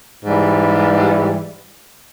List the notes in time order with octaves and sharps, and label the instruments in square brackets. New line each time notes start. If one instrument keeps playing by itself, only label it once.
[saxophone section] G#2 E3 G3